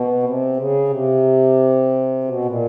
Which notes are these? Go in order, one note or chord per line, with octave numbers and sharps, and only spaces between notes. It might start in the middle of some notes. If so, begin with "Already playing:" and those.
Already playing: B2
C3
C#3
C3
B2
A#2